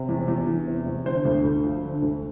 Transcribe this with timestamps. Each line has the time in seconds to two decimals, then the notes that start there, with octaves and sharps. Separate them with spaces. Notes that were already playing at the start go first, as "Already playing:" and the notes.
Already playing: C3
0.09 E2
0.28 E2
0.47 E3
0.67 C3
0.86 E2
1.06 D3 C5
1.25 D2
1.44 D2
1.64 F3
1.84 D3
2.02 D2